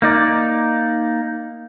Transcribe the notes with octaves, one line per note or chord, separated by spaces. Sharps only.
A#3 D#4 D5